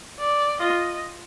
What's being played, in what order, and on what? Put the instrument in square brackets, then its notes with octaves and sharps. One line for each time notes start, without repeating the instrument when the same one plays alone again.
[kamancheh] D5
[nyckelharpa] F4 [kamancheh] D#5